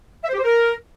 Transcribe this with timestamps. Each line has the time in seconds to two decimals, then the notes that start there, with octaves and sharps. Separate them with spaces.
0.24 E5
0.29 C5
0.34 G4
0.39 C5
0.44 A#4